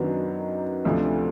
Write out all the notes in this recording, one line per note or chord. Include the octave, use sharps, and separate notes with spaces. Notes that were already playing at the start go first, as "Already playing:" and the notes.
Already playing: F#2 D#3 F#3 B3 D4
D2 C3 F3 A3 D4